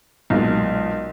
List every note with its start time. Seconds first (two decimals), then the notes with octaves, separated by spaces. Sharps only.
0.30 B1 A#2 G#3